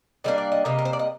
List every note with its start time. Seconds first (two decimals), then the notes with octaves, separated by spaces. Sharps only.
0.24 D3 G3 A#3 D4 D#5
0.38 D5
0.52 D#5
0.65 C3 G3 A#3 D#5
0.79 A#4
0.85 C5
0.93 D5
0.99 D#5